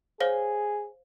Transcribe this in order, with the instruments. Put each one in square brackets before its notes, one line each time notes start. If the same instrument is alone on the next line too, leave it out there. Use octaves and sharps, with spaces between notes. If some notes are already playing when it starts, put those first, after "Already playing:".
[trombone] G#4 [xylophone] C5 C#5 F5